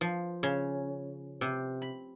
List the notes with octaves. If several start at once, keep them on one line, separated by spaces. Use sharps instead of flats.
F3
C#3
C3
B5